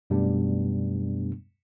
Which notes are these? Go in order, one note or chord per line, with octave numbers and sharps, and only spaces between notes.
F#2 B2 G3 A3 B3 D4